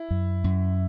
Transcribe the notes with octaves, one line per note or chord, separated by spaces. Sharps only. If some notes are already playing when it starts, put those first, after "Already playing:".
Already playing: E4
F#2
F#2